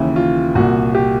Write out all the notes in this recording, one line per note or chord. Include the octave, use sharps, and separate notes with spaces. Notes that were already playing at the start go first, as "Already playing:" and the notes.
Already playing: D#2 C#3 E3 E4
F4
C2 A#2 F#4
G4